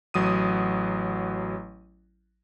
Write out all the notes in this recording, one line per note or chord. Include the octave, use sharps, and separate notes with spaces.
A1 F#3 D#6 D#7